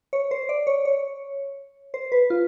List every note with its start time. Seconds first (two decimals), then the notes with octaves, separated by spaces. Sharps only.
0.13 C#5
0.31 C5
0.49 D5
0.67 C#5
0.85 C#5
1.94 C5
2.12 B4
2.30 F4